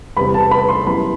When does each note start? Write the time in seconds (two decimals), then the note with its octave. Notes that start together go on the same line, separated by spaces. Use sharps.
0.17 E2 C3 G3 B5
0.34 A5
0.51 B5
0.68 C6
0.86 F#2 E3 G3 B3 B5